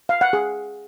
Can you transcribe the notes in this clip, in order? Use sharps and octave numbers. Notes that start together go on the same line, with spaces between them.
F5
F#5
G#4